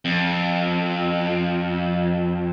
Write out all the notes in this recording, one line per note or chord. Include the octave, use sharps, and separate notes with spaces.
F2